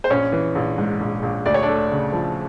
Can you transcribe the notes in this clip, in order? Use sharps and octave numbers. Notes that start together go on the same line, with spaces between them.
C5
A#1 C#4 C#5
E3
A#1
G#2
A#1
A#1
D2 D5
C#5
D4 D5
A3
C#3
F3